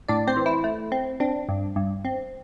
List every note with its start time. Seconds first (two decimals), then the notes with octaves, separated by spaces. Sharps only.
0.08 A2 D4 D5
0.27 C4 C5
0.37 E3
0.46 E4
0.64 A3
0.92 C4
1.20 C4 D4
1.49 G2
1.76 G2
2.05 C4